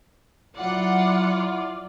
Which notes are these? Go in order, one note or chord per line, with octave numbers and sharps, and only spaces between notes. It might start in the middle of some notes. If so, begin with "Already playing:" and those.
F#3 E4 F4 D5 F#5